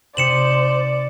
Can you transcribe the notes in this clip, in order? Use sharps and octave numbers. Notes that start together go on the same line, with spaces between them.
C3 D#4 C5 D5 C#7 D#7 E7 F#7